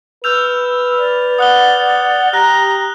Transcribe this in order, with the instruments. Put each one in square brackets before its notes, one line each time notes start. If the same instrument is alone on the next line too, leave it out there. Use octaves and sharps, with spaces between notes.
[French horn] B4 [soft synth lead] E6 [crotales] F6 G6 F7
[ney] D5
[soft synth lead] F#5 [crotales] D#6 F#6 G7
[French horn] G4 [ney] A#5 [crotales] F#6 [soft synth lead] A#6